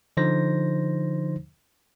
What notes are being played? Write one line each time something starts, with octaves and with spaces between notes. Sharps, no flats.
D3 F3 D#4 C5 A#6